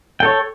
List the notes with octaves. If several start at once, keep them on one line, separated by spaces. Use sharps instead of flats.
A4 C#5 G5